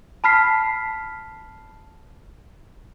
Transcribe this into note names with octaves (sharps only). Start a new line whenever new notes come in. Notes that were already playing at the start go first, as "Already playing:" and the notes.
A5 B5 F6 B6 C7